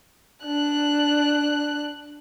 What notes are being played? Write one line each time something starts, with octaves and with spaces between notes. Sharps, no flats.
D4 F#6